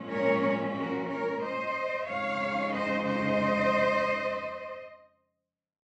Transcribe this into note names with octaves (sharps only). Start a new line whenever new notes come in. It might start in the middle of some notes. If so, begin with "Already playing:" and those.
Already playing: A#2 F3 G#3 C#4
A#4 C#5
F#4 A#4
A#4 C#5
C5 D#5
F2 C#3 G#3 D#4 C#5 F5
C5 D#5
C5 D#5